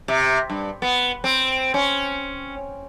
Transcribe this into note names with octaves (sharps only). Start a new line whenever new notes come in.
C3
G2
B3
C4
C#4